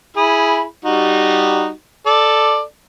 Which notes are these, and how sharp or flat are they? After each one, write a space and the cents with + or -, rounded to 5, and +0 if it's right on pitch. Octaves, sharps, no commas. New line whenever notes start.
E4 +0 G#4 +0 B5 -15
G3 +0 D#4 -15 F#4 +0
A4 +0 D5 +10